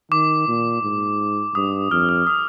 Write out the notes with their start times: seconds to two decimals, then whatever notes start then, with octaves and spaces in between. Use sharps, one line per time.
0.11 D#3 D6
0.48 A#2
0.83 G#2
1.55 G2 D#6
1.91 F2 F6
2.09 F6
2.27 D#6